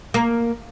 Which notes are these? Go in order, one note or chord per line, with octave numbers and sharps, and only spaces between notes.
A#3